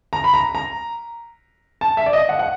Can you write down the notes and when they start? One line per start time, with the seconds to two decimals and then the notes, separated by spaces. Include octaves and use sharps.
0.13 A#5
0.24 B5
0.34 A#5
0.55 A#5
1.81 A5
1.97 E5
2.06 D5
2.13 D#5
2.29 F#5
2.39 F#5